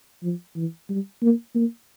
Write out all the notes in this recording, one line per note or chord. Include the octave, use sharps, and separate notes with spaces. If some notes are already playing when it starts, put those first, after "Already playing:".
F3
E3
G3
A#3
A#3